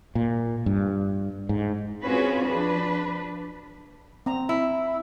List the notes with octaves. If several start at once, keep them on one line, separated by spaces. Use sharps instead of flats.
A#2
G2
G#2
C4 C#4 F4 F#4 G#4 B4
F3 D4 B4
C4 A#5
E4